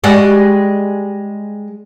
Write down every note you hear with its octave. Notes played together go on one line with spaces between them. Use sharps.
G3 G#3 F#4